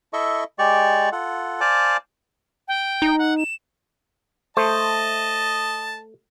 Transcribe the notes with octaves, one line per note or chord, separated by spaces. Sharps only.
E4 A4 D#5 E5 C#6
G#3 G4 D5 C#6
F4 A4 F#5
C5 D5 F5 G#5 A5 D6
G5
D#4
F#5
E7
A3 C5 D#5 A5